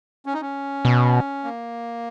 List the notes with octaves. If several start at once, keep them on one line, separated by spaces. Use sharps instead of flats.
C#4
D#4
C#4
B2
A#3